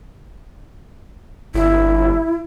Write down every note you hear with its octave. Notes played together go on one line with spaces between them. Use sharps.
G1 E4